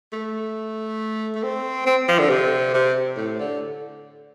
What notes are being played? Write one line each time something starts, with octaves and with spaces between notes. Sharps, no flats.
A3
A3
C4
C4
F3
D3
C3
C3
A2
D3